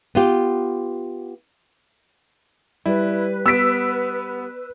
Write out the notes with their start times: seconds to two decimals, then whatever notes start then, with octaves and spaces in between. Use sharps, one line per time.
0.15 B3 F4 G4
2.86 G3 E4 B4
3.46 B3 E6 B6 D7